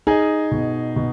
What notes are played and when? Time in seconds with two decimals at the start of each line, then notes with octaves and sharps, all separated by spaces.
0.07 D#4 G#4 G#5
0.51 B2
0.96 B2